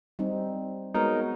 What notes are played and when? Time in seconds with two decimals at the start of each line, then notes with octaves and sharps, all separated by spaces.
0.19 G3 C4 D#4
0.94 G#3 B3 D#4 F#4 A#4 C#5